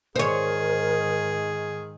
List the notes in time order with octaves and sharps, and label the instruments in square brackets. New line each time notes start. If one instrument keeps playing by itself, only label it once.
[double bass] G#2 D#3 [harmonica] G#4 [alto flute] A#4 [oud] C5 C#5